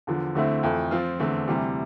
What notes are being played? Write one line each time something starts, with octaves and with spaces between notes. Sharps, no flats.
E2 D3 F3
D2 D3 A3 C4 E4
F2 E3 A3
F3 C4 F4
E2 D3 A3 C4
D2 C3 E3 G3